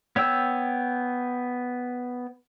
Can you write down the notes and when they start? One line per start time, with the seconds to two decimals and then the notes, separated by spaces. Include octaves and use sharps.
0.16 B3 C#5 G5 E6